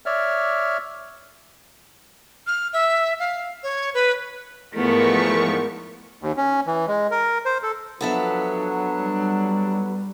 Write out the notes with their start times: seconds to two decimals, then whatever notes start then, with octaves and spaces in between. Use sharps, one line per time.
0.06 C#5 D5 E5 F6
2.47 F6
2.73 E5
3.20 F5
3.63 C#5
3.94 B4
4.75 E2 G#2 F3 A3 B3 A#4 C#6
6.22 D#2
6.37 C#4
6.67 E3
6.88 G#3
7.11 A#4
7.45 C5
7.63 A4
8.01 F3 F#3 B3 D4 A4 E5
8.97 G3